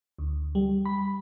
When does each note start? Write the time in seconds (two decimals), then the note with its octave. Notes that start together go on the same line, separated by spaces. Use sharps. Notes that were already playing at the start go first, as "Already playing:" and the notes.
0.19 D2
0.55 G3
0.85 B5